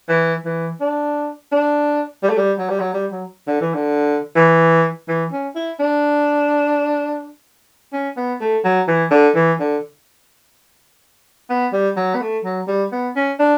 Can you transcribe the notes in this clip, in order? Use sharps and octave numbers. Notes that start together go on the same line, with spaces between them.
E3
E3
D4
D4
G3
A3
G3
F#3
G3
F#3
G3
F#3
D3
E3
D3
E3
E3
C#4
E4
D4
C#4
B3
A3
F#3
E3
D3
E3
D3
B3
G3
F#3
B3
A3
F#3
G3
B3
C#4
D4